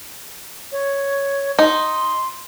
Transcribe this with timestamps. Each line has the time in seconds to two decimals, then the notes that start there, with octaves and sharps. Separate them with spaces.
0.72 C#5
1.59 D#4 C6